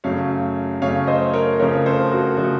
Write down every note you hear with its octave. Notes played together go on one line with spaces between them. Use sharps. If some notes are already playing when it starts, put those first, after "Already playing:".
F#2 C#3 A3 C#5 F5
F#2 C#3 A3 C#5 F5
C5 D#5
A#4 C#5
F2 C#3 F3 A3 A#4 C#5
A4 C5
F#4 A#4
C#3 F3 A3 F#4